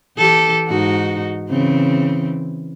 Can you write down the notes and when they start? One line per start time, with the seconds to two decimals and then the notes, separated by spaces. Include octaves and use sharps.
0.18 E3 G4 A4
0.67 G#2 D#4 F#4
1.49 C#3 E3 C4